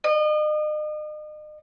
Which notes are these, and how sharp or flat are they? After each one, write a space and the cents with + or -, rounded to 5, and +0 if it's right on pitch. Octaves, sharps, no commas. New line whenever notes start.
D#5 -40